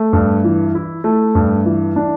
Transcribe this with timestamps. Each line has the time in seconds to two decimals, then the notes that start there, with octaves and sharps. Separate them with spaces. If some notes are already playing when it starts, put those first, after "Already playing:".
Already playing: A3
0.13 G2
0.44 E3
0.75 E4
1.04 A3
1.35 G2
1.66 E3
1.96 D4